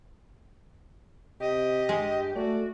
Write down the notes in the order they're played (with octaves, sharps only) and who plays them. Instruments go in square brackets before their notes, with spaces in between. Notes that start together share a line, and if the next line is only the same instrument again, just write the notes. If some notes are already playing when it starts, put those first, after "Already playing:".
[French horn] C3 [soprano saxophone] G4 [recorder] D#5
[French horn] G2 [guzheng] G#3
[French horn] A3 [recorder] F#4 [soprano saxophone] D5